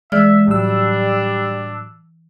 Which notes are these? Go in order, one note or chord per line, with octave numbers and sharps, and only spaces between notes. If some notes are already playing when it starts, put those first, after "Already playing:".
E3 G#3 D5 E5 F6
A2 F#3 G3 D4 E6